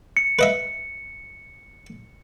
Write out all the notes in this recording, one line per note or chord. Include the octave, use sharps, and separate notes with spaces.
C#7
B4 D#5 E5